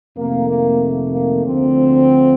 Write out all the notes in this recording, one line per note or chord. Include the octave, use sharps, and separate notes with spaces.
F2 C3 D#3 A3 A#3
A#3
A#3
D2 D3 F3 C4